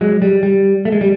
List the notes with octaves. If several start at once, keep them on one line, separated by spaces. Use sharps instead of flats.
F#3 G#3
G3
G3
A3
G#3
G3